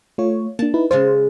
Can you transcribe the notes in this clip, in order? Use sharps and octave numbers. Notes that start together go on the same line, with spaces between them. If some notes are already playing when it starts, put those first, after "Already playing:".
A3 F4 C#5
A#3 D4 A5
D#4 E4 B4
C#3 G#3 F4 C5